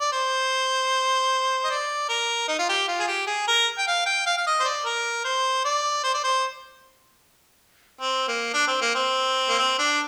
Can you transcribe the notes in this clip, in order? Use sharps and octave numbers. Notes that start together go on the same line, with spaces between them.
D5
C5
D#5
D5
A#4
D#4
F4
G4
F4
G#4
G4
G#4
A#4
G5
F5
G5
F5
F5
D#5
C5
D5
A#4
C5
D5
C5
D5
C5
C4
A#3
D4
C4
A#3
C4
A#3
C4
D4